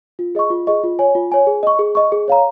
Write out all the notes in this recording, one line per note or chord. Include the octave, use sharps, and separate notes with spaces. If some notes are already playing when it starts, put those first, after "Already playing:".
F4
G#4 D#5 C#6
F4
G#4 D#5 C#6
F4
C#5 G#5
F4
C#5 G#5
G#4
D#5 C#6
G#4
D#5 C#6
G#4
C#5 F5 A#5